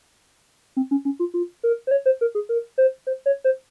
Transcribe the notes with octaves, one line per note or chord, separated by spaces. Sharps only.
C4
C#4
C#4
F4
F4
A#4
C5
C#5
C5
A#4
G#4
A#4
C5
C5
C#5
C5